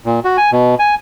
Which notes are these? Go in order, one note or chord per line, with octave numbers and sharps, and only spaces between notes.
A#2
F#4
G#5
B2
G#5